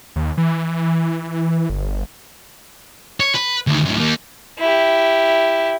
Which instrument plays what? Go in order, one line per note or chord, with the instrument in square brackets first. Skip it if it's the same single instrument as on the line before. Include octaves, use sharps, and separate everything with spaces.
[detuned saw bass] D#2
E3
G1
[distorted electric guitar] C#5
B4
D2 D#3
F#2 A2
D#2 A#3
[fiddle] E4 G4